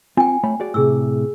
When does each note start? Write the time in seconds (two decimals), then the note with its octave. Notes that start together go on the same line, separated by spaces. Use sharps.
0.17 C4 F4 G5 G#5
0.43 A3 C#5 B5
0.60 F#4 G#4 D5
0.74 A2 C3 G#4 E6